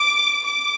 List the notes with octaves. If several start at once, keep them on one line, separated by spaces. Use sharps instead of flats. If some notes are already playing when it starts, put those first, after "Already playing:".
Already playing: D6
D6